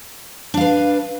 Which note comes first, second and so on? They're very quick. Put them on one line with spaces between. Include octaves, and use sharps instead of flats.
D4 F5 B4